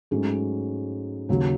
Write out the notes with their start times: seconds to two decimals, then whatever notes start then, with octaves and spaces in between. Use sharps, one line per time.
0.11 G#2 F#3 A3 C#4 G#4
1.29 D#2 C#3 F#3